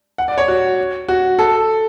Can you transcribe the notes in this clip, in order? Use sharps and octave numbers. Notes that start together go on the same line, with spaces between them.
F#5
D5
C#5
F#4
F#4
A4